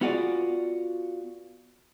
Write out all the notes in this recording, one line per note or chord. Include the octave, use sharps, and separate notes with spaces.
B3 F4 F#4 G#4 D5